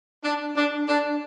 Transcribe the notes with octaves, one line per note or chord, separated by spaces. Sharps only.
D4
D4
D4